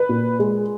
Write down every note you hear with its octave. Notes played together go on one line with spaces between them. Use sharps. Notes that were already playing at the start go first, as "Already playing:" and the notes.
Already playing: B4
A#2
G#3